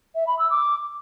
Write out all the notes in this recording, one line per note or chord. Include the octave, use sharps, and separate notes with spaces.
E5
B5
E6
D6